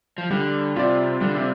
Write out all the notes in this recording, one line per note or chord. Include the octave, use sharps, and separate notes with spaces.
F3
D3 G3
C3 F4 D5
D3 G3
C3